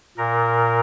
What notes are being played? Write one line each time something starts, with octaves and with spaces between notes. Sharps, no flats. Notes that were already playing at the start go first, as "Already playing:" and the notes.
A#2 A#4